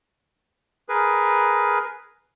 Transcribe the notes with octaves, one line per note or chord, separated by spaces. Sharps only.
G#4 A#4 B4